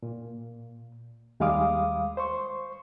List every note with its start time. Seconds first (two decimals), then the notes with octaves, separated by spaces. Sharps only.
0.03 A#2
1.40 D#2 G3 G#3 F5 D6 D#6
2.17 C5 C6 C#6